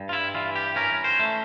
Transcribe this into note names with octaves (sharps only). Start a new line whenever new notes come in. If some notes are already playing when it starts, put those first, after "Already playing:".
Already playing: G2
F4
E4
E3 F4
G4
C#4 A#4
C5
A3